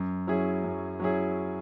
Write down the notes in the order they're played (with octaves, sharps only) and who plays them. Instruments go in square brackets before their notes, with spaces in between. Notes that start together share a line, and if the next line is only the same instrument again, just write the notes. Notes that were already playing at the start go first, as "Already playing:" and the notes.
Already playing: [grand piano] F#2
F#3 C#4 E4 G#4
F#2
F#3 C#4 E4 G#4